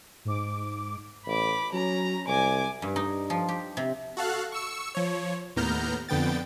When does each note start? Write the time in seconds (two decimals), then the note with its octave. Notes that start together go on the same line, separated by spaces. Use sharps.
0.25 G#2 D6
1.27 A1 B5 D6
1.73 F#3 C#4 A#5
2.28 C2 G#5 D6
2.82 G2
2.96 D#4
3.30 F3
3.48 G4
3.77 C3
4.17 F#4 A4 F5 F#6
4.52 C#6 E6 C#7
4.95 F3 C#5
5.56 D#2 A2 B3 A#5 F6 G6
6.09 F2 D3 B3 G5 A6